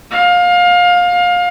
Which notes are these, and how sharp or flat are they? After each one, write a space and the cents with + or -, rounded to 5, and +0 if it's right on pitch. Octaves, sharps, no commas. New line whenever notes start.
F5 +25